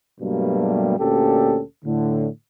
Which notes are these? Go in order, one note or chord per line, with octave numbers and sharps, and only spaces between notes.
G2 B2 F#3 G3 A3 A#3
D2 A#2 C#4 G4 A4
A2 D3